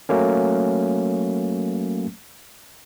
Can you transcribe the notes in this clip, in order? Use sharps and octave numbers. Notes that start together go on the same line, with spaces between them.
F#3 A3 A#3 C#4